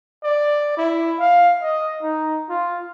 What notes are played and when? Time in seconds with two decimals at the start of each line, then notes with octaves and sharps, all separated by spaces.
0.24 D5
0.77 E4
1.19 F5
1.61 D#5
2.03 D#4
2.49 F4